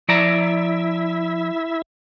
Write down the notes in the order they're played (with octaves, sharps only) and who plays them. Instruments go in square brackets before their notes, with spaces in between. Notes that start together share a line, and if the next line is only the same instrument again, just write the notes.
[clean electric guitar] F3 D5 A#5 [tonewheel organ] E4 E5